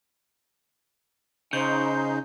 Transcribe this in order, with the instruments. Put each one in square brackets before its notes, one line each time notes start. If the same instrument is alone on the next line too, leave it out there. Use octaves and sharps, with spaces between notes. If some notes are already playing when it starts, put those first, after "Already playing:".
[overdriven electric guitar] C#3 [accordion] D#4 [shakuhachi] C5 [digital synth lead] G6